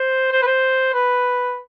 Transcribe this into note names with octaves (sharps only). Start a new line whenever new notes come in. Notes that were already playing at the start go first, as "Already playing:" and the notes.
Already playing: C5
C5
B4
C5
B4